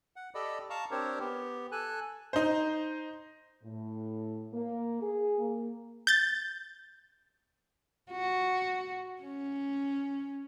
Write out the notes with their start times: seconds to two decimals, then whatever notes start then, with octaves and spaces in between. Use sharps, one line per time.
0.16 F#5
0.35 G4 A4 D5 D#5 B5
0.70 F5 A5 A#5 C#6
0.91 C4 D4 G4 A#4 C5 C#5
1.20 B3 G4
1.72 A4 G#5 F#6
2.33 D#4 C5
3.64 A2
4.53 A#3
5.02 G#4
5.38 A#3
6.07 G6 A6
8.12 F#4
9.22 C#4